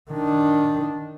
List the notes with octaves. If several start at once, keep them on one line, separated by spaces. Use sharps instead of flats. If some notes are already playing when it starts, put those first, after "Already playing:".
D#3 D4